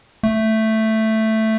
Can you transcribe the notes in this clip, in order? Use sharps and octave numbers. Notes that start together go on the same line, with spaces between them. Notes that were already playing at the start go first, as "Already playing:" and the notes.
A3